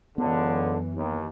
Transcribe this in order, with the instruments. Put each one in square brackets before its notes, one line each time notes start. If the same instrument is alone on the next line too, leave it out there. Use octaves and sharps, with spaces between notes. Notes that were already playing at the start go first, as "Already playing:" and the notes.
[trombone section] C#2 D3 [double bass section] F#2 E3 [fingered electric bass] B3
[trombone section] D#2